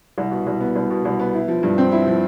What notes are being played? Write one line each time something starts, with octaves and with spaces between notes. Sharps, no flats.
C2
B2
C2
B3
C2
B2
C2
B3
E4
F3
G2
C4
E4
F3